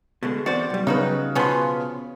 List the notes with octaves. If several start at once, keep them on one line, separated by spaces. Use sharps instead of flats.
B2 D3 G#3
E2 C4 F#4 C5 D5
B1 G3
C#3 D#4 F#4 B4
B2 F3 B3 C#4 C6